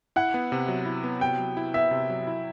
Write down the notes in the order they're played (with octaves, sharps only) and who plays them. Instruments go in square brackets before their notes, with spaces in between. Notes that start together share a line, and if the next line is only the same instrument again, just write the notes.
[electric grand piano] E4 [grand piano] F#5
[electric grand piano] B3
C3
F#3
E4
B3
[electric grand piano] C3 [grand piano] G5
[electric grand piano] F#3
E4
[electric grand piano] B3 [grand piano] E5
[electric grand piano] C3
F#3
E4